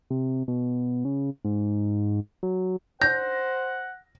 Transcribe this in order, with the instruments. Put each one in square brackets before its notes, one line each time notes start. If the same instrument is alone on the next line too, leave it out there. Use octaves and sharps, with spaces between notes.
[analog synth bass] C3
B2
C#3
G#2
F#3
[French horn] C5 [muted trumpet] F#5 [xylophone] G6 [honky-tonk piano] A#6